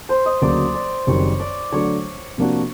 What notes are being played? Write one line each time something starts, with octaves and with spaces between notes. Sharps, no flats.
C5
D#5
D2 C#3 F#3 A#3 D5
D5
F#1 F#2 D#3 G3 C4 C#5
D5
D3 F#3 A3 D4 C#5
C3 F3 A#3 D4 F#4